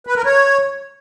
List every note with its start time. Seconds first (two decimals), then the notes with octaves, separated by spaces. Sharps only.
0.07 B4
0.16 A#4
0.25 C#5